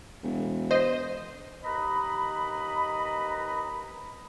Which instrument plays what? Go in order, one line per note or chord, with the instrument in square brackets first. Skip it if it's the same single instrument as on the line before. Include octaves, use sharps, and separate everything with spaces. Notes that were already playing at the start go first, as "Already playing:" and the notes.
[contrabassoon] E1
[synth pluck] C5 D#5
[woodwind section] D#2 B4 D#5 A#5 B5